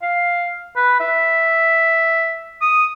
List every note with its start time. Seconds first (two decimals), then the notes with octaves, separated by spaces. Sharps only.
0.02 F5
0.76 B4
1.00 E5
2.61 D#6